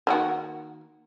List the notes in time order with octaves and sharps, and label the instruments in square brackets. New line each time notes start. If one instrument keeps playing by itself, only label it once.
[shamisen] D#3 A#3 F#4